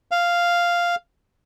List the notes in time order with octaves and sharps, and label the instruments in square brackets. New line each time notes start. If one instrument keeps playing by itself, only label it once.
[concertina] F5